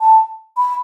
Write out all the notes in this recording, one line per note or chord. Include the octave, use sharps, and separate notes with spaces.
A5
B5